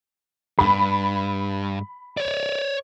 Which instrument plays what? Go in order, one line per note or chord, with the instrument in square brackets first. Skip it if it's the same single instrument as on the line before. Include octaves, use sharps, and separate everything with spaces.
[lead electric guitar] G2 [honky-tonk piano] B5
[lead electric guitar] C#5 D5